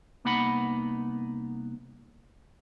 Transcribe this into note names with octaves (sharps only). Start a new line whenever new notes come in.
C2 A#3 B3 D#4 F#5 B5